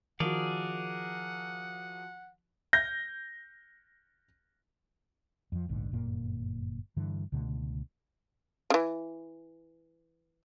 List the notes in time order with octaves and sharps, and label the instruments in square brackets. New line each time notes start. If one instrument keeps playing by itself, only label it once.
[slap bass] D#3 [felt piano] F3 F#4 [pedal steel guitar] G#4 A#4 D5 [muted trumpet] F#5
[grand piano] G6 A#6
[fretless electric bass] F2 F3
D1 A#1 G#2 D3
G1 F#2 A#2 A#3
G2 D3 E3
C#2 B2 D3 A3
[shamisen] C#3 E3